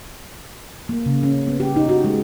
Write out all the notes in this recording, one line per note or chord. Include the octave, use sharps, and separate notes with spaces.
A#3
C#3
C#4
B3
G4
D#4
F#4
G#3